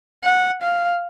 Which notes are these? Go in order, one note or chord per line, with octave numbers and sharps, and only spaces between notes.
F#5
F5